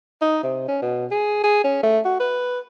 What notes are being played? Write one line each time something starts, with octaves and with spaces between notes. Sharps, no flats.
D#4
C3
C#4
B2
G#4
G#4
C#4
A3
F#4
B4